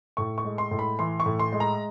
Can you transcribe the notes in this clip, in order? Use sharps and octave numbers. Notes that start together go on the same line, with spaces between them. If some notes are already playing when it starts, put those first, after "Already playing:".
A2 C#6
C#6
G#3
C6
A2
B5
E3 C6
C#6
A2
C6
G#3
A#5